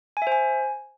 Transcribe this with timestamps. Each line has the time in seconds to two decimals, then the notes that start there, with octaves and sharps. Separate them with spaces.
0.17 G#5
0.22 E5
0.27 C5
0.32 G#5